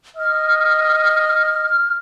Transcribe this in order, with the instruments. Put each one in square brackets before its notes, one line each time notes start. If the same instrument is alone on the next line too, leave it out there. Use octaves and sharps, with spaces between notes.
[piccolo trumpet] D#5 [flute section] F6